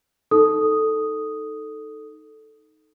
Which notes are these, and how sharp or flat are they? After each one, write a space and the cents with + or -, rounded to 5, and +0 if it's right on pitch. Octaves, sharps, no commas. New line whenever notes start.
D#4 +0 A4 +0 D#6 +0